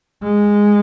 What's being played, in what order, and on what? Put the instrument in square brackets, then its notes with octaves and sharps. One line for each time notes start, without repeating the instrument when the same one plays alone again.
[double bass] G#3